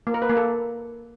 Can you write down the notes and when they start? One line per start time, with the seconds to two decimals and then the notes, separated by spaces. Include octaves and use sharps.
0.07 A#3
0.14 A#4
0.22 B4
0.29 A#3
0.37 A4